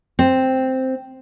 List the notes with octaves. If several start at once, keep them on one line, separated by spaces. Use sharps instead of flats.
C4